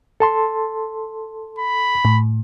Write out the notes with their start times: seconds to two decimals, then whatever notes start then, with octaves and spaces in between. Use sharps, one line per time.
0.20 A4 A5 C6
1.59 B5
2.05 A2